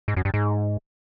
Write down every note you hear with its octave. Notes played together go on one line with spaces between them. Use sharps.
G#2
F#2
G2
G#2